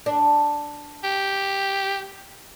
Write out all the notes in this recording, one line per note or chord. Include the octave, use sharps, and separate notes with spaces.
D4
G4